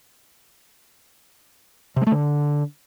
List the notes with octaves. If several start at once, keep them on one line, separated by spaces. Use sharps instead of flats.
C3
G#3
A3
D3